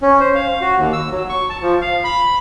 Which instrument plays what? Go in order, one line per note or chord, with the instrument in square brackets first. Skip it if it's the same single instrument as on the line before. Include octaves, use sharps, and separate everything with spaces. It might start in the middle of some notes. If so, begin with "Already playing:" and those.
[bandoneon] C#4
C5
F5
F#4
D#2
E6
F#3
C#6
A5
F3
F5
B5